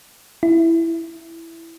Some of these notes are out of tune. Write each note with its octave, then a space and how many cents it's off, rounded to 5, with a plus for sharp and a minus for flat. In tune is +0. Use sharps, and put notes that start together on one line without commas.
E4 +5